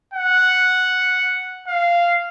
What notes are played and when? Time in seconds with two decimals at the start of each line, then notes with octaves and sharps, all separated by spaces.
0.14 F#5
1.67 F5